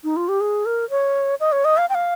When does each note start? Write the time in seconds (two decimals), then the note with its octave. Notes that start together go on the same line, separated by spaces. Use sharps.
0.04 D#4
0.16 F4
0.28 G4
0.41 G#4
0.66 A#4
0.90 C#5
1.40 D#5
1.52 C#5
1.65 D#5
1.77 F5
1.90 G5
1.95 F5